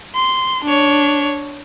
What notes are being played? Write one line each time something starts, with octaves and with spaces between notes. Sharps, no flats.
C6
D4 C#5